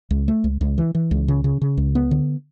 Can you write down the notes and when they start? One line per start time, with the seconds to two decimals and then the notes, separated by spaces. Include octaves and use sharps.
0.11 C#2
0.28 A3
0.44 C#2
0.61 C#2
0.78 E3
0.95 E3
1.11 C#2
1.28 C#3
1.44 C#3
1.62 C#3
1.77 C#2
1.95 B3
2.11 D3